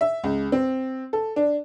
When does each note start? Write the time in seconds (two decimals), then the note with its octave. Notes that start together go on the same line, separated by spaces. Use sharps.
0.01 E5
0.24 C#2
0.52 C4
1.13 A4
1.36 D4